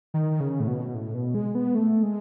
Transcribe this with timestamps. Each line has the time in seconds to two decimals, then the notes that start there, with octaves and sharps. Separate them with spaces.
0.14 D#3
0.40 C#3
0.60 A2
0.68 B2
0.94 A2
1.14 B2
1.35 G#3
1.55 B3
1.75 A3
2.03 G#3